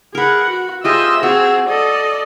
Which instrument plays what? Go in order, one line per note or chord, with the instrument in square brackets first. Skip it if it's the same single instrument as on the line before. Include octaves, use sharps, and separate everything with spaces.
[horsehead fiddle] G#4 F#5 [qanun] A#4 B4
[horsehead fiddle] F#4
[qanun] F4 G4 G#4 [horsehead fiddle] C5 E5 [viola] D#5 [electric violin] E6
[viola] C4 [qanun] F#4 [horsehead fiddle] G#4
[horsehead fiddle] A4 [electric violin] D5 [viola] D#5